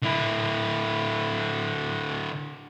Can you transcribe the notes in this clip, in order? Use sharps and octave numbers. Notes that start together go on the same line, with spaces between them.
D3 E4